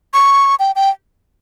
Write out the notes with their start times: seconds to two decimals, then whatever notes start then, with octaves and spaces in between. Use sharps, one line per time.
0.14 C#6
0.60 G5
0.76 G5